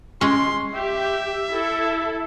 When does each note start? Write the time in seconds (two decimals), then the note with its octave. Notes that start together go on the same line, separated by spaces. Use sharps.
0.21 G#3 C#4 C6
0.74 G4 E5
1.49 E4 A4